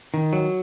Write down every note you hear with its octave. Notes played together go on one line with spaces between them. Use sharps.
D#3
F#3